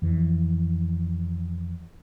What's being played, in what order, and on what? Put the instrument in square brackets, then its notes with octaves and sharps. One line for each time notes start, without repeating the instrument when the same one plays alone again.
[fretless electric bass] F2 E3